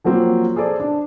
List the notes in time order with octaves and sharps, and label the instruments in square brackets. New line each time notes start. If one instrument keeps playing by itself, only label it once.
[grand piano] F3 F#3 A#3 C4
G#4 A4 C5 D5
D4